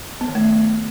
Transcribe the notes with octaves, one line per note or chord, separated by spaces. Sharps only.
B3
D#3
A3